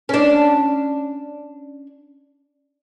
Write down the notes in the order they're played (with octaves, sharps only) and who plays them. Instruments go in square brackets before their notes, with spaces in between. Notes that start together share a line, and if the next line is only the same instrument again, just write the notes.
[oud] C#4 D4